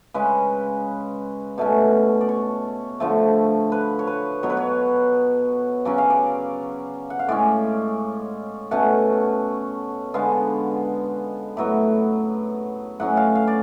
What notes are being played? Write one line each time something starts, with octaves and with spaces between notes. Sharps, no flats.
C#3 G#3 C#4 B4
B2 A3 C#4
D5
C#5
D3 F3 A3
B4
C#5
B4
B2 F#3 B3 C#5
B4
C#5
C#3 F#3 C#4 D5
F5
D5
F#5
F5
A2 G#3 C#4 D5
B2 A3 C#4 F#5
D3 G#3 B3 F5
A2 F#3 B3
A2 F#3 C#4 F#5
F5
F5
D5